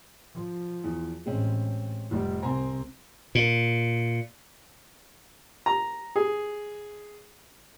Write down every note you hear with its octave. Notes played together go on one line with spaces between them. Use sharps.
F3
E2
A1 G#3 C4 C#4
F1 G3
C2 C4 C5 G#5 A#5
A#2
A#5
G#4